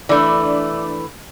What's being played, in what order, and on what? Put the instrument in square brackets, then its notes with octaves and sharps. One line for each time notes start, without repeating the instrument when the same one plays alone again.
[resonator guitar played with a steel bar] E3 A3 [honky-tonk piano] D4 D5